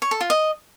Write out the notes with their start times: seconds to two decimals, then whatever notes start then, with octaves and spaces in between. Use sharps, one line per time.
0.02 C#5
0.11 A4
0.21 F4
0.30 D#5